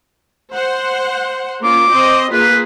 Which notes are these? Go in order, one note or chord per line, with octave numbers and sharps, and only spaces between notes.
C5 F#5
A#3 C#4 F4 D6
C4 C5 D#5
A#3 F4 G#4 B4